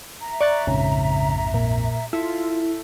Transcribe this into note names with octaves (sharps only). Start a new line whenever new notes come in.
E5 A#5
D5 C#6 F#6 A6
A#1 F2 G#2 C#3
A#2
E4 F4 A4 E5